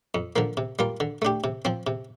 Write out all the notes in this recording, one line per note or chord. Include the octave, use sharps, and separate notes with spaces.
F2
D3 F3 A#3
C3
G3 A#3 F4
D3
A3 D4 G4
C3
F3 C4
C3